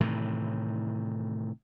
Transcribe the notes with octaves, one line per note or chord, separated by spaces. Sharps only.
A2 C3 D#3 E3